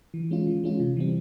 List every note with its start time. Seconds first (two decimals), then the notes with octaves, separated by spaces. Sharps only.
0.14 E3
0.31 G#3 C#4 F4
0.47 E3
0.64 G#3 C#4 F4
0.80 C3
0.97 E3 G3 C4